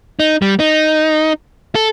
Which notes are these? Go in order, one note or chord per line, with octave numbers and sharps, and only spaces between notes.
D#4
G3
D#4
A4